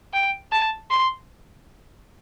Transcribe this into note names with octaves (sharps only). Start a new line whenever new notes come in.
G5
A5
C6